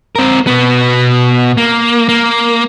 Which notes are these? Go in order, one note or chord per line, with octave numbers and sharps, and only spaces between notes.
C4 A#4
B2 B3
A#3
A#3